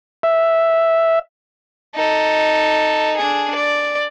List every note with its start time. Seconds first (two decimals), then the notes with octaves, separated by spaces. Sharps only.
0.23 E5
1.95 D#4 A4
3.17 D4 G#4
3.55 D5